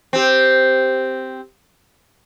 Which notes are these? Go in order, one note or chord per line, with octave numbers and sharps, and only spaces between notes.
C4 G4